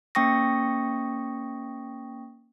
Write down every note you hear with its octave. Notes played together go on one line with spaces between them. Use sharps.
A#3 C#4 G5 C#6 D#6 A#6